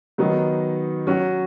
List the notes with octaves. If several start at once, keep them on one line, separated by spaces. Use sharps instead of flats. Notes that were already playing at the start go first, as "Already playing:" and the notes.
D#3 F#3 B3 D#4
F#3 C#4 F#4